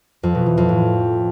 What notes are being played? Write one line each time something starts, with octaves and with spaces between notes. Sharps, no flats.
F2
B2
E3
F2
A2